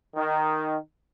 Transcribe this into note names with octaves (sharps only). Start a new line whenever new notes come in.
D#3